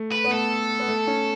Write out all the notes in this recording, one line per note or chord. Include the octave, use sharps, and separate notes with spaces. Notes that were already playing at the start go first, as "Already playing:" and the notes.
Already playing: A3
B4
B3
A3 A4
B3
A3
C#4